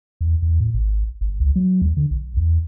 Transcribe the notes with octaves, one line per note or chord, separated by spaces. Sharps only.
E2
E2
A2
G#1
G1
C#2
F#3
D#2
D3
B1
E2